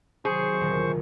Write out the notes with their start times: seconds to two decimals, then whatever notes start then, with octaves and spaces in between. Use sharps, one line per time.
0.25 C3 D#3 F#3 G#4 C5 C#6
0.61 D#1 D2